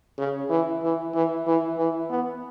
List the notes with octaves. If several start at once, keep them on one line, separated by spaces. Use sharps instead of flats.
C#3
E3
E3
E3
E3
E3
B3